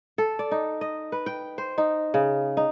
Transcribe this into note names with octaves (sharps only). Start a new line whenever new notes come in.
A4
D5
D#4
D#5
B4
G5
C5
D#4
C#3
D#4